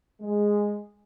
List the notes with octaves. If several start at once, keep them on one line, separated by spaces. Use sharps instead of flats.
G#3